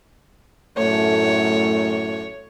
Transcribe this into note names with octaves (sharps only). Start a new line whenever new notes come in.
F#2 A2 A3 C#5